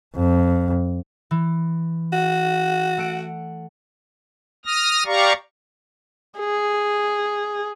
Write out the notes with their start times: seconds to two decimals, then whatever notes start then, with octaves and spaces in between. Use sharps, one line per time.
0.15 F2
1.31 E3
2.13 F#4
2.98 A3 F#5 D7
4.66 D#6 F6 A#6
5.06 G4 D5 F5 A#5 C#6
6.39 G#4